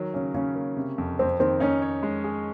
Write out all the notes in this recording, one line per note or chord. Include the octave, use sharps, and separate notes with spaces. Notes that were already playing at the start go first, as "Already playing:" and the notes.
Already playing: D#3 F#3
C#3 C#4
C#3 C#4
A#3
C3
F2
F2 C4
D#3 C4
C#4 D#4
C#5
G#3
G#4